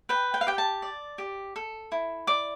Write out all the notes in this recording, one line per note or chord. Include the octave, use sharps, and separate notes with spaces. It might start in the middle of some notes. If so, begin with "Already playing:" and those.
B4 G5
G5
F5
G4 G5
A5
D5
G4
A4
E4
D5 D6